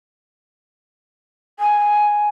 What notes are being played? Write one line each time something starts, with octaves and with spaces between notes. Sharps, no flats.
G#5